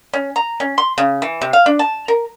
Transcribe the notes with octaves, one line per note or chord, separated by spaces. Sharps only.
C#4
A#5
C#4
C6
C#3
E3
C3
F5
D4
A5
A#4